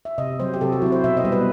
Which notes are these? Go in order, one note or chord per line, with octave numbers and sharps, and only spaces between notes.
E5
C3 D#5
F#3 C4 C5
G4
C3 A4
F#4
F#3 C4 E4
C5
B2 E5
D#5
G3 B3
B4